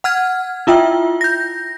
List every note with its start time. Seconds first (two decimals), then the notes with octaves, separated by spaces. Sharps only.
0.04 F#5 F6 G#6
0.67 E4 F4 E5 G5
1.21 G6 A#6